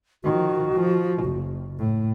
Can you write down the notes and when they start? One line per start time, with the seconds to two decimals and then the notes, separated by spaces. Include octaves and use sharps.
0.24 D#3 F3 F#4
0.74 F3
1.25 F#1
1.78 A2